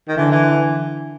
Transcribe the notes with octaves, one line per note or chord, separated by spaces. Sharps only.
D#3
D3 E3
E3